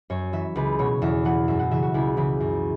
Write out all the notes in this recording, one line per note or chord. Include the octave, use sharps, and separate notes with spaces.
F#2 C#5
E3 E5
C#2 B4
B2 C#5
E2 E5
E3 F#5
F#2 E5
F#5
C#3 E3 E5
F#4
C#2 E4
C#3 E3 E4
F#2